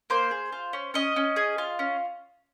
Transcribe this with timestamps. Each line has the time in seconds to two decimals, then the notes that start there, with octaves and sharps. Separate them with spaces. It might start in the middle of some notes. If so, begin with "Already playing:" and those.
0.10 A#3 C5
0.31 G#4
0.52 F4
0.73 C#4
0.94 C#4 D#5
1.16 C#4
1.36 G#4
1.58 F4
1.79 C#4